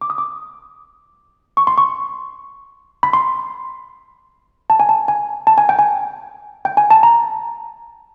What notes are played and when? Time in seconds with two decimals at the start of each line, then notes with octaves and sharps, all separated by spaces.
0.01 D6
0.10 D#6
0.18 D6
1.57 C#6
1.67 C6
1.78 C#6
3.03 B5
3.13 C6
4.70 A5
4.80 G#5
4.89 A5
5.08 G#5
5.47 A5
5.58 G#5
5.69 G5
5.79 G#5
6.65 G5
6.77 G#5
6.91 A5
7.03 A#5